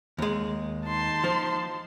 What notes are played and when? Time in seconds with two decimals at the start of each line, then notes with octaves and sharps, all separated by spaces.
0.18 D#2 G#3
0.88 D#4 A5 C6
1.24 F3